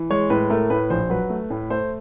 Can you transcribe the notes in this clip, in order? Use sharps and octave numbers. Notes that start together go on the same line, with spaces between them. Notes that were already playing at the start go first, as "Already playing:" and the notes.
Already playing: E3
G#3 C#5
A2 B4
A3 A#4
A2 B4
A#1 C5
F#3 B4
A3
A2
A3 C5